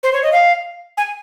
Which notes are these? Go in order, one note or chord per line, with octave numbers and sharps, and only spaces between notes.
C5
C#5
D#5
F5
G#5